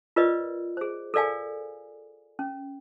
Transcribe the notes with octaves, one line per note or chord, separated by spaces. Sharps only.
F4 A#4 B4 D5 D#5
G#4 C5
A4 A#4 D5 F5 G#5
C#4